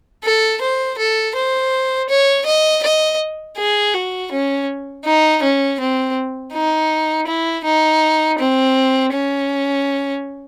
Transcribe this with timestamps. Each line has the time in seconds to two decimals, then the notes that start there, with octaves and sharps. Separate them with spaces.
0.24 A4
0.61 C5
0.98 A4
1.35 C5
2.09 C#5
2.46 D#5
2.83 D#5
3.57 G#4
3.94 F#4
4.32 C#4
5.05 D#4
5.42 C#4
5.80 C4
6.53 D#4
7.27 E4
7.64 D#4
8.39 C4
9.13 C#4